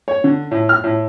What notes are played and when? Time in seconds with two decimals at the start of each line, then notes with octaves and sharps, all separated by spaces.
0.08 C#5
0.24 D3
0.51 A2
0.69 F6
0.84 A2